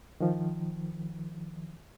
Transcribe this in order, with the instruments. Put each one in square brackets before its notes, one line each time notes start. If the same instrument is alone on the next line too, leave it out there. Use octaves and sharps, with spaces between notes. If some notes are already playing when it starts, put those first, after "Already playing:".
[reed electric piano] D#3 F3